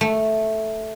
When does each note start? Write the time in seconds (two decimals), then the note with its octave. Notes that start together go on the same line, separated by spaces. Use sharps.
0.01 A3